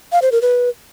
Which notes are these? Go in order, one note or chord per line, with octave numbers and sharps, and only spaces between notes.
F5
C5
A#4
B4